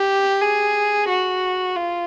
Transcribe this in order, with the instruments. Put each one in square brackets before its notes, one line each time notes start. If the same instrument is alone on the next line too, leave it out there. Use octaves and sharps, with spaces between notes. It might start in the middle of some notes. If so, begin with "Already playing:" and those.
Already playing: [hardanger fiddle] G4
G#4
F#4
F4